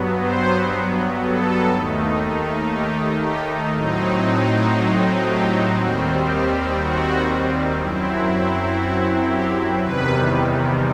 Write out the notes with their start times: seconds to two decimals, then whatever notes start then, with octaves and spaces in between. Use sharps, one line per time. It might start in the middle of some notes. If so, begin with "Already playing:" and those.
Already playing: G2 F#3 B3
0.19 C5
1.21 A4
1.72 D#2 D#3 A3 D#4
2.72 G4
3.22 G4
3.73 A2 F#3 C4 D#4
5.25 G4
5.75 D#2 D#3 G3 C4 F#4
6.26 G4
6.77 F#4
7.77 F#2 F#3 C4 E4
8.79 F#4
9.29 G4
9.79 E2 C3 D#3 G3 B4